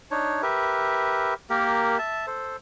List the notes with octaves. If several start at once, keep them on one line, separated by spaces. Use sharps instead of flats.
D4 D#4 C#5
G4 A#4 B4 E5
A#3 G4 A#4
E5 A5
A4 C5